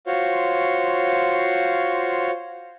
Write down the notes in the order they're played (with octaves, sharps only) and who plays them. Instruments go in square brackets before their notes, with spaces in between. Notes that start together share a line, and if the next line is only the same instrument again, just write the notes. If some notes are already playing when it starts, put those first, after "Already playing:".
[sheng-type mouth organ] F4 F#4 C5 C#5